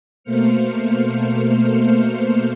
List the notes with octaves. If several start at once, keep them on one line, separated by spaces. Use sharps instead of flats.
B2 A3 A#3 C5 F6 C#7